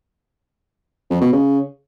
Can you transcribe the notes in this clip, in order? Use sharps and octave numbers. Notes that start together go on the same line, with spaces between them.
F2
B2
C#3